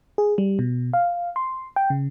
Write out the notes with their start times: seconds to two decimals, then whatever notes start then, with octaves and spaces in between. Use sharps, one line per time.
0.18 G#4
0.38 G3
0.59 B2
0.93 F5
1.36 C6
1.76 G5
1.90 C#3